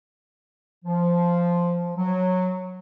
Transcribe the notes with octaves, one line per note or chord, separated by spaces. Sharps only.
F3
F#3